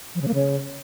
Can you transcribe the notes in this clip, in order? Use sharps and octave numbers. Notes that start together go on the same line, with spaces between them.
F3
C#3
A#3
C#3